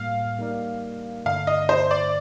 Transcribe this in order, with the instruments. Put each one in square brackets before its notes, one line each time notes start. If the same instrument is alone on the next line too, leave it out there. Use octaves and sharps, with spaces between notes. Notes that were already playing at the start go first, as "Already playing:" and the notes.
Already playing: [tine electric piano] A2 G3 A#3 [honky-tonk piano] F5
[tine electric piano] G3 A#3 D#4 A#4 D5
[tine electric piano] G2 D3 A3 [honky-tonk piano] F5
[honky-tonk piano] D#5
C5
D5